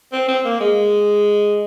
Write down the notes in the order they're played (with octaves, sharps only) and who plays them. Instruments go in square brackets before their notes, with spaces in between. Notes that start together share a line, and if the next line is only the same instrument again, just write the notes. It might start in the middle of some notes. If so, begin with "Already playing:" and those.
[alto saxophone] C4
C4
A#3
G#3